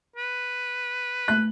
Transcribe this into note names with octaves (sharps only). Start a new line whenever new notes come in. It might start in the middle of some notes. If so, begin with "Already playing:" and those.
B4
A3 F#6